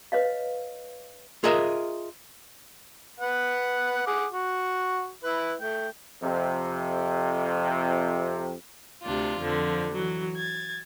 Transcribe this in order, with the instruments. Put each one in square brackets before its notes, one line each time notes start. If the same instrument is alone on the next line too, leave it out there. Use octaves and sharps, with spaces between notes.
[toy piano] B4 C#5 D#5 F5
[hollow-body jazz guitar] F4 G#4 A#4 D#5 E5
[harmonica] B4 F#5
G#4 F#5 D6
F#4
E4 B4
A3 G5
[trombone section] F2 C3
[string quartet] D2 C3 D4 F4
F2 D3 F3
E3 F#3
G#6 A6